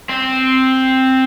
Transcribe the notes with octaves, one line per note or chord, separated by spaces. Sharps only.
C4